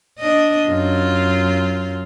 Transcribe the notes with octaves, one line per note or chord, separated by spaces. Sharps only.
D4 D#5
F#2 F4